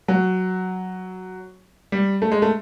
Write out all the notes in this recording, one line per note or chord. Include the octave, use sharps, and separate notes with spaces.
F#3
G3
A3
G#3
A3